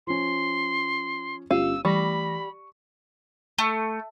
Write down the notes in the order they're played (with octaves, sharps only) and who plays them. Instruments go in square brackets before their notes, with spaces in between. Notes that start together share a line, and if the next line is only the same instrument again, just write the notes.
[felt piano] F3 C#4 [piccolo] C6
[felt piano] G1 D#7 [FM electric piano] C#4 F4 G4 [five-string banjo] F5 [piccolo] E6
[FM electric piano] E3 A3 A#6 [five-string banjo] G3 [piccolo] B5 [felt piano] C#6
[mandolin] A3